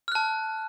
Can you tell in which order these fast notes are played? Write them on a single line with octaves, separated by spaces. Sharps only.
F6 F#6 A5